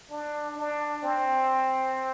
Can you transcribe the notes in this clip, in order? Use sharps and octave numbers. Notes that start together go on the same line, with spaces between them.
D4
D4
C4